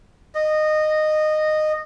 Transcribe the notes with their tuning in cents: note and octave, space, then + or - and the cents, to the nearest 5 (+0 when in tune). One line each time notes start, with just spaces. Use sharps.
D#5 -15